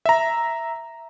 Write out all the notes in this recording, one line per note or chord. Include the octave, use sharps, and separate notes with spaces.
E5 A#5